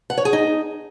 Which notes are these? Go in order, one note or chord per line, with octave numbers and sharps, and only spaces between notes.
F#5
C#5
G#4
D#4